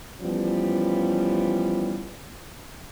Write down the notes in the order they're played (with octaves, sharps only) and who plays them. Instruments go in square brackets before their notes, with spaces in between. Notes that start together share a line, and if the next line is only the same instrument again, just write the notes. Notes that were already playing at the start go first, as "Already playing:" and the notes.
[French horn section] E3 F3 G3 B3 C#4